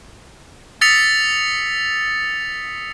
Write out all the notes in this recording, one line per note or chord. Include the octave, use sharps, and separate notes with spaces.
D#6 E6 A6 B6 C#7 F7